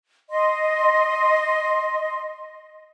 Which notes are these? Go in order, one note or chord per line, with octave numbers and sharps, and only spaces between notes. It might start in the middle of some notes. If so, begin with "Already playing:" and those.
D#5 C6